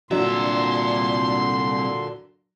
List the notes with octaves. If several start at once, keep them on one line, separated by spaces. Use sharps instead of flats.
C2 A#2 D3 F#3 D4 E5 C6